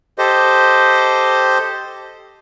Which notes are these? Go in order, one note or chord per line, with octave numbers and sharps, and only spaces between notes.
G4 A4 C5 D#5